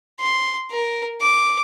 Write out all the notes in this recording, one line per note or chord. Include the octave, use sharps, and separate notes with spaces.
C6
A#4
D6